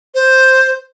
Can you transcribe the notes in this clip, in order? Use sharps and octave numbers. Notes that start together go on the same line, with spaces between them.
C5